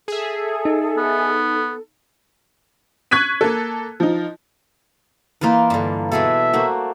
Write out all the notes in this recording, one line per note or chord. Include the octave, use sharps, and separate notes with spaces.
G#4 A4 E5
D#4
B3
C#6 F#6 G#6 B6 D#7
A#3 A4
F3 D#4
E3 A#3 D#4 F4 B4
G2 D3
B2 E3 G#4 A4 E5
A3 A#3 F#4 C5 D5